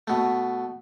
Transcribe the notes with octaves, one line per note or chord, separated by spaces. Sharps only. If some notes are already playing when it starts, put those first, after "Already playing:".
B2 A3